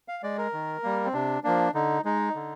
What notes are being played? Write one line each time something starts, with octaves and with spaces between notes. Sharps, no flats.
F5
G#3 D5
A#4
D#3
G3 A#3
C4
C3 D4
F3 A#3 D4
D3 D#4
G#3 D#4
D3